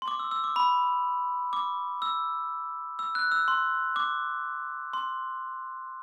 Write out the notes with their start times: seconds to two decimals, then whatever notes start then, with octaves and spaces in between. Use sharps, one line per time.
0.02 C6
0.08 D6
0.19 E6
0.31 E6
0.44 D6
0.56 B5
1.53 D6
2.02 E6
2.99 E6
3.15 F#6
3.32 E6
3.48 C6
3.96 D6
4.93 C6